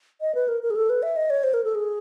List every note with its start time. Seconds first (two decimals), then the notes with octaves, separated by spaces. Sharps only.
0.21 D#5
0.35 B4
0.48 A#4
0.63 A#4
0.70 G#4
0.76 A4
0.89 B4
1.03 E5
1.16 D#5
1.30 C#5
1.44 C5
1.54 A#4
1.64 A4
1.75 G#4